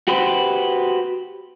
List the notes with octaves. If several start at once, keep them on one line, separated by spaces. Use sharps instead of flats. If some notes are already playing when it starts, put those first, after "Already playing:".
F#4 G4 B4 C5